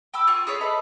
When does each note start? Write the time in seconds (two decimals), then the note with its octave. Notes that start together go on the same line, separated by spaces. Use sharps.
0.14 G5 B5 D6 E6
0.27 F4 G#5 C#6
0.47 G#4 B4 C#5 D5
0.61 A4 B4 D#5 B5